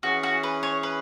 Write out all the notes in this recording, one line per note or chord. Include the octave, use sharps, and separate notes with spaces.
E3 C#4 F#4 G#4
F#4
B4
C#5
B4